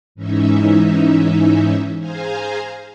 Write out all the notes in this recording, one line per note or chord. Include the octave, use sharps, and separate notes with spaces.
G#2 E3 C#4 D#4 E5
G#4 C5 F5 G#5 A#5